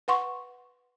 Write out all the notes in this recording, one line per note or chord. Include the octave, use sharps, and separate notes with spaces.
B4 F#5 C6 C#6